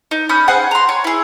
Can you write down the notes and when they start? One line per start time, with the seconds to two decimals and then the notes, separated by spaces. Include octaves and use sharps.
0.11 D#4
0.29 C#4 B5 D#6 G6
0.48 G#4 C5 F#5 G#5
0.71 A#5 C6
0.89 C#5 G#5
1.04 E4 G#4